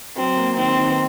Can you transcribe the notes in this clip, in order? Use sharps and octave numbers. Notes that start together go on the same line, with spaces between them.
F#3 C4
A#3
D#3 C4
D#3